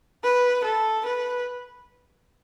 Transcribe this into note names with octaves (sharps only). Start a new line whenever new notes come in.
B4
A4
B4